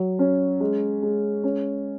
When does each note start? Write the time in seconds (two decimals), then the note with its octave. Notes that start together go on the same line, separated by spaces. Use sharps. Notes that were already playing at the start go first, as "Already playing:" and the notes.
Already playing: F#3
0.19 C#4
0.60 G#3
1.03 G#3
1.44 C#4